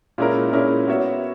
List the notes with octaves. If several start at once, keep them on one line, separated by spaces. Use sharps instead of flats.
A#2 G#3 C#4 E4 A#4
A#2 G#3 C#4 E4 A#4
B3 F#4 C#5 E5